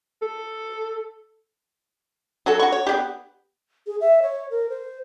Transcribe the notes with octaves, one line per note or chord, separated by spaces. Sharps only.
A4
F#3 F#4 A4
F#4 C#6
C#5
B3 D4 G4
G#4
E5
C#5
A#4
C5